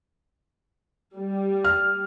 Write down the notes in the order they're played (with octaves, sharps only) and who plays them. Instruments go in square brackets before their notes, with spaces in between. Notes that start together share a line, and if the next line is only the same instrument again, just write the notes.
[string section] G3
[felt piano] F6